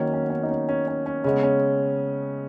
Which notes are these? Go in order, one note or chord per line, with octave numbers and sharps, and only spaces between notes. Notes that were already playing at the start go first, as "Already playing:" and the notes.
Already playing: D#3 F#3 A#3 C#4
C#4
B3
C#4
D#4
C#4
C#4
C#4
C#4
C#3 G#3 B3 C#4
C#4